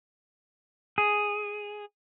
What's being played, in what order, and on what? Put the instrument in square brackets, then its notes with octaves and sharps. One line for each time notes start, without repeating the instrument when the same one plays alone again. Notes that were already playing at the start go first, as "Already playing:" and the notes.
[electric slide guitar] G#4